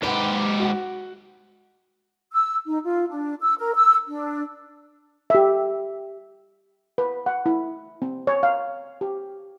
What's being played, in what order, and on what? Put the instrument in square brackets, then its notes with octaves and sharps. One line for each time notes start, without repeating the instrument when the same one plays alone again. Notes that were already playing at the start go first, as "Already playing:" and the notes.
[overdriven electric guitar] G#2 G4 [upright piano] B4 F#5
[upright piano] F#4 F#5
[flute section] E6
D#4
F4
D4
E6
A#4
E6
D4
[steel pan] G4 E5
B4
F#5
E4
C4
C#5
F5
G4